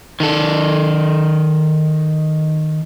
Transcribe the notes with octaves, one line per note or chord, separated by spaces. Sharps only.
D#3 A4